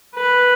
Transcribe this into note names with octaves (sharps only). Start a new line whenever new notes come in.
B4